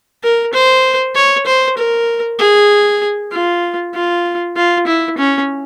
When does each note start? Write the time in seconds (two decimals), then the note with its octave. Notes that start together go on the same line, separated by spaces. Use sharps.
0.23 A#4
0.53 C5
1.15 C#5
1.46 C5
1.78 A#4
2.39 G#4
3.32 F4
3.94 F4
4.56 F4
4.87 E4
5.18 C#4